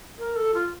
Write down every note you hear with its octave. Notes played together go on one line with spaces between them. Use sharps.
A#4
A4
F4